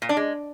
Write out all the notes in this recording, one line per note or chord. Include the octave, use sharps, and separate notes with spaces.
A#2
D4
G#3